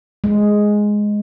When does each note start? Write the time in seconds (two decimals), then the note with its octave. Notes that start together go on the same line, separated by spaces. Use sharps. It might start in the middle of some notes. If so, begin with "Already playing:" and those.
0.24 G#3